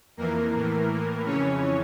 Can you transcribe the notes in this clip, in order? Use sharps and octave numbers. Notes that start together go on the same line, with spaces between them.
F2 E3 A#3 A#4
A2 E3
A2 E3
F2 C#3 E3 C#4 C#5